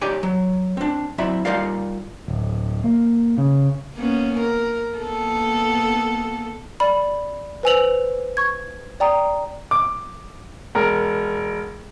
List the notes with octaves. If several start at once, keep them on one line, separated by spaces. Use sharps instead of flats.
D#4 G4 C#5 D5 G5 G#5
F#3
C4 D4
F#3 C4 E4 D5 E5 B5
G3 D#4 F4 A#4 D5 F5
D1
A#3
C#3
A#3 B3 C#4
A#4
A#3 B3 A4
D5 B5
B4 C5 G#5 E6 F7 F#7
C#6 G#6
D5 G5 A#5 D#6
D6
E1 A#4